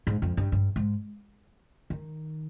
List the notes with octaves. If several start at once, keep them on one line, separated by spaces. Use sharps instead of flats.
G#2
F2
G2
G2
G#2
D#3